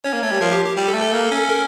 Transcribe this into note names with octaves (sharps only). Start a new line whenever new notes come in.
C#4 C#5
A#3
A3 C#5
G3
F3 A#4
G4
G4
G3 G4
A4
A3
A4
A#3
C#4
A#4